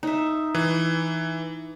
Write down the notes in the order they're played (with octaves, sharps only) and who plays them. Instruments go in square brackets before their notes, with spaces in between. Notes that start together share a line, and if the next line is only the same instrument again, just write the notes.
[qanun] D#4 E5
[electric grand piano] E3